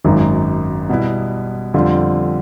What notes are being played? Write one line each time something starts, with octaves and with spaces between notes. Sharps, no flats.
G#1 F#2 D#3
B2 G3 B3 E4
F2 D3 G3 C4 F4